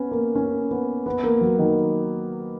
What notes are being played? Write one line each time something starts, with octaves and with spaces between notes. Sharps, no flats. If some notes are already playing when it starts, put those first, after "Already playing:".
Already playing: B3 C#4
A#3
C#4
B3
B3
A#3
F#3
D#3